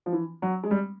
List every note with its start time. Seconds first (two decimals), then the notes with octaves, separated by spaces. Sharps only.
0.06 F3
0.12 E3
0.42 F#3
0.63 G#3
0.71 G3